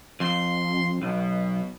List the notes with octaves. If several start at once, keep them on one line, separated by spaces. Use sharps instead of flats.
F2 C6
B1 B2